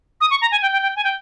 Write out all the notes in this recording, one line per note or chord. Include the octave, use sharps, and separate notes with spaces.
D#6
C#6
A#5
G#5
G5
G5
G5
G#5
G5